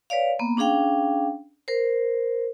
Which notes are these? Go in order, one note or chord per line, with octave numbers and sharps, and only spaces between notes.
B4 C#5 D5 F5
A#3 B3
C#4 D4 G#4 F5 G5
A#4 C5